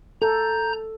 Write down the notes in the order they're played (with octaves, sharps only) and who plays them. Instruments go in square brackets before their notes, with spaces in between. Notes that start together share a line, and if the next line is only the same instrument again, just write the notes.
[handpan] A4 [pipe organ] A#5 G6